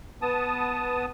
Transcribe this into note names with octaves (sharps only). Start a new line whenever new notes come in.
B3 A5 D#6